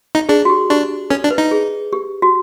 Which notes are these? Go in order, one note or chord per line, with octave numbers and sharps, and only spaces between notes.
D#4
D4 G#4
F#4
G4
D4 G4
C#4 A4
D4
B4
D#4
G#4
G4
F#4